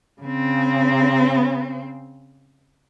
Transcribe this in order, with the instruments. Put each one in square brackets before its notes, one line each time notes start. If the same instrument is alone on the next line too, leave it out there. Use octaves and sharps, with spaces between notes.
[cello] C#3 C4